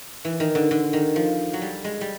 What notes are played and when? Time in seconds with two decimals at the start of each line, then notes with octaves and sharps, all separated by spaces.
0.25 E3
0.40 D#3
0.55 D3
0.71 D3
0.93 D#3
1.16 F3
1.53 F#3
1.62 G3
1.84 G#3
2.01 G3